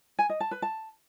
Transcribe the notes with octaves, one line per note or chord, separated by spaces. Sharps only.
G#5
D#5
A5
B4
A5